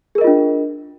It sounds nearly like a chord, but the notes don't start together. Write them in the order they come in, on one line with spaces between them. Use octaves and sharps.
G#4 A#4 D#5 F4 D4